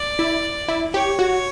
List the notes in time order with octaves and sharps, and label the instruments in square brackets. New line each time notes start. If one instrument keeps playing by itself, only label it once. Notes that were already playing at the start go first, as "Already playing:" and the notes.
Already playing: [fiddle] D5
[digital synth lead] E4
E4
[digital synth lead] G4 [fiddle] C#5
[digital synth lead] F#4